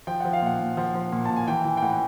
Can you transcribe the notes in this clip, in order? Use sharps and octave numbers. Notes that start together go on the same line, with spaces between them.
F3 G5
F3 F#5
F5
A#2 F#5
A#2
F3 F#5
F3
A#2
A#2 A5
G#5
E3 G5
E3
G5
A2 F#5